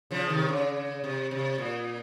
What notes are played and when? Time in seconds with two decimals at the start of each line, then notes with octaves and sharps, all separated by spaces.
0.11 C#3 F3
0.29 C3 D#3
0.49 C#3
1.04 C3
1.31 C3
1.58 A#2